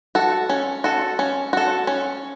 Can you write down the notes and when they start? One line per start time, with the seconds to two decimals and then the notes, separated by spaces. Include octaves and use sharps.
0.15 F#4 A4
0.49 C#4
0.84 F#4 A4
1.19 C#4
1.53 F#4 A4
1.87 C#4